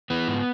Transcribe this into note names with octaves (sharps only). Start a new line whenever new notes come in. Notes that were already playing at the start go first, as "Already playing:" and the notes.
E3 B3
G#2